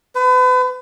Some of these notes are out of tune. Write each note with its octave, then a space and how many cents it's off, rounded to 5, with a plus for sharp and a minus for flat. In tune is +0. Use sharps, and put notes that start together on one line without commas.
B4 +35